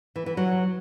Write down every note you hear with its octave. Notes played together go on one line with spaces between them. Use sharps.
E3
E3
F#3